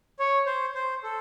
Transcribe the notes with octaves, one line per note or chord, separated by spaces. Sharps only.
C#5
C5
C5
A4